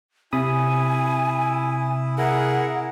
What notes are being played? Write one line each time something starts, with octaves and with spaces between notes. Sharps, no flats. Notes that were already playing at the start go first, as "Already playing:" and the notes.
C3 E4 G#5 B5 D#6
E4 G#4 A#4 F#5